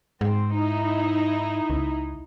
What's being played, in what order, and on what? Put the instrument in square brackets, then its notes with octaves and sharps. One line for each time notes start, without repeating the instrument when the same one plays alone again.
[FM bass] G#2 [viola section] C4
[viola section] D#4 E4
[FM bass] C#2